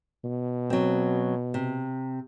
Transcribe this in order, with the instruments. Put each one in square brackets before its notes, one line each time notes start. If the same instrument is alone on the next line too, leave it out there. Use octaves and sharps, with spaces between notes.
[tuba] B2
[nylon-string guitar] F#3 C4
C3